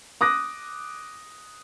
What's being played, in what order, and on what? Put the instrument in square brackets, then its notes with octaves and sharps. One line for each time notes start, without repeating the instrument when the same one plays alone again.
[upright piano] D6 D#6 F#6 A#6